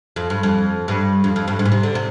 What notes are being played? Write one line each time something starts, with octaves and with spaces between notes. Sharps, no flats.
F2
G2
F2
G2
F2
F2
G2
G#2
A#2
C3
D3
C3